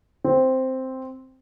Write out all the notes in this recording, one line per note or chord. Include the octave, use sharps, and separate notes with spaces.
C4